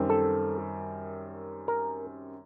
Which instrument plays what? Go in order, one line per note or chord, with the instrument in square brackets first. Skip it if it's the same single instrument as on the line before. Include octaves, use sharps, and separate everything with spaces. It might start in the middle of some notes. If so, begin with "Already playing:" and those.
Already playing: [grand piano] F#2 D#3 G3 C4
[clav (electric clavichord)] A4
A#4